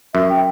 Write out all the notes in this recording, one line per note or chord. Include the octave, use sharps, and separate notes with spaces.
F#2 E5
G5